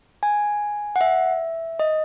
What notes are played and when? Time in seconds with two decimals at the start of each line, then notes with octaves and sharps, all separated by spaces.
0.23 G#5
0.96 F#5
1.01 E5
1.79 D#5